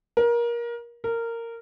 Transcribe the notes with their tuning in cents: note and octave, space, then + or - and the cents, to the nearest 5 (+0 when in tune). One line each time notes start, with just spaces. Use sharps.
A#4 +25
A#4 -15